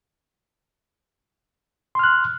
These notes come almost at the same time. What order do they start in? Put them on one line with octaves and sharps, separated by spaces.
C6 F6 F#6